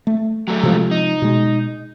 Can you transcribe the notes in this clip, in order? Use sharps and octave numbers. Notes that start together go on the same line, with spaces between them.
A3
F#3 A3
C3 F3 G#3
D#4
B2 G#3